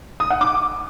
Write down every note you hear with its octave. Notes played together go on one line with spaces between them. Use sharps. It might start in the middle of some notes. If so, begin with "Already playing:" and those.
D#6
F#5
D6